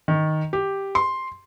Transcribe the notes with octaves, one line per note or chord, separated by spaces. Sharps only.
D#3
G4
C6